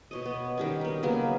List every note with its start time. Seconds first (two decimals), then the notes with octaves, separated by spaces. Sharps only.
0.11 B2 C#5 D#5
0.25 B3
0.58 D#3 G3 C#4
0.81 B3 D#4
1.03 C#3 F#3 A#3 B3